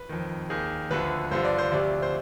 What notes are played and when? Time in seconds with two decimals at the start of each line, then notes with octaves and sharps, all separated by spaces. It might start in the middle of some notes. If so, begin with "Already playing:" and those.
Already playing: B4
0.09 F2 D#3
0.50 D#2 D#3 G#4
0.91 D2 D3 F3 B4
1.31 G2 D3 F3 C5
1.45 D5
1.58 C5
1.72 D2 C3 F3 D5
2.03 C5